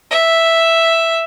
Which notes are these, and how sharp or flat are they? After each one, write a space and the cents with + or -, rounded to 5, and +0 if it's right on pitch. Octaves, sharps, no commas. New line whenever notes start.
E5 +0